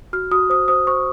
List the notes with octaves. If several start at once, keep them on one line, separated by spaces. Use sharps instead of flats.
F#4 F6
F#4 D#6
C5 D#6
C5 D#6
C5 C#6